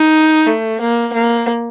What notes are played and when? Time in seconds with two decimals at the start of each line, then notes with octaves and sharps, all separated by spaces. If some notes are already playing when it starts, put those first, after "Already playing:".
Already playing: D#4
0.47 A3
0.81 A#3
1.13 A#3